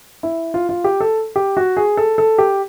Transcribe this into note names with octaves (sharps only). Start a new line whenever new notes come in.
E4
F4
F4
G4
A4
G4
F#4
G#4
A4
A4
G4